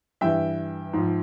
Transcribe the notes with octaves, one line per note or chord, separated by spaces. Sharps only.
G2 E3 E5 G5
G#2 F3